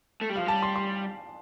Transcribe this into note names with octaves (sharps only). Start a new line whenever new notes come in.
A3
G3
F3 F5
G3 A5
C6
C6